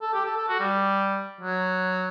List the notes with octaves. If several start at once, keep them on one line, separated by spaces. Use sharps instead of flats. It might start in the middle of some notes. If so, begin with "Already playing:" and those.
A4
G4
A4
A4
F#4
G3
F#3